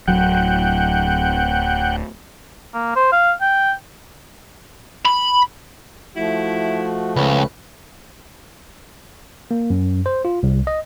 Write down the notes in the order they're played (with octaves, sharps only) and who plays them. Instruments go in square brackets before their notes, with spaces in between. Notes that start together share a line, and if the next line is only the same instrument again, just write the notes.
[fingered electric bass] D1 F#3 [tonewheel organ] F#5 G5
[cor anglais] A#3
C5
F5
G5
[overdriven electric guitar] B5
[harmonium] F3 A3 [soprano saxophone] E4 [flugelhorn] F#4
[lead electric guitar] C#2 [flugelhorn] C#4 [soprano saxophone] B4
[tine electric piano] A#3
F#2
C5
F4
C2
D#5